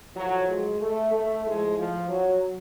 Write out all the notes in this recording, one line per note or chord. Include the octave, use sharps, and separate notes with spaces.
A2 F3 F#3
G#3
A3
A3
A2 G#3
F3
F3
F#3